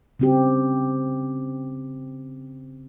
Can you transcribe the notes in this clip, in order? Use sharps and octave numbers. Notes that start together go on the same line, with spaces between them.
C#3 C4 G4